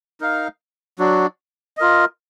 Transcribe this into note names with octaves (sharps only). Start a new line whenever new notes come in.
D#4 A#4 F5
F#3 D4 F#4
F4 A#4 D#5